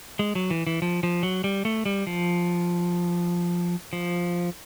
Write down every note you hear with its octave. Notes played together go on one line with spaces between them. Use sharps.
G#3
F#3
E3
E3
F3
F3
F#3
G3
A3
G3
F3
F3